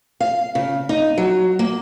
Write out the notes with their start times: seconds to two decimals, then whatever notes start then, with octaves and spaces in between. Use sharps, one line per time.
0.20 F5
0.55 C#3
0.89 D#4
1.18 F#3
1.59 A#3